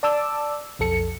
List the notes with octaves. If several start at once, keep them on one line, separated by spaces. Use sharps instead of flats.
D5 A5 D6 E6
B1 F2 A4 C#7